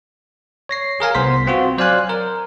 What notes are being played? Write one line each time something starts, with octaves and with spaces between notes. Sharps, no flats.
C#5 A#6 C7
G#4 A#4 F5 G#5
C2 B3 C5 C6 B6
C4 F4 F#4
F#3 C5 D5 F5 G#5 F#6
A#4